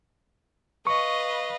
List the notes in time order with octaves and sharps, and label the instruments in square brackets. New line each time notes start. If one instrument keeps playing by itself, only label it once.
[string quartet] B4 D#5 F5 [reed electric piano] C#6